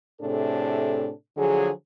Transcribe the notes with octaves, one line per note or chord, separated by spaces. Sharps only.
A2 C3 D4 G#4 A4
D3 F3 F#3 G#4